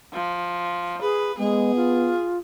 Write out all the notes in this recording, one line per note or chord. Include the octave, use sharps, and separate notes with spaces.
F3
G#4 B4
G#3 B3 G#4
F4